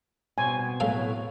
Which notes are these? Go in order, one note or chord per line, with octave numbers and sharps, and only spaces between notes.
B2 C4 G#5
A2 F#3 A4 F5